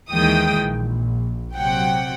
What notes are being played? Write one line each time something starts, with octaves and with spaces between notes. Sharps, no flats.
D#2 D#3 E3 G#3 G5 D#6
A#1
C3 F#3 F#5 G5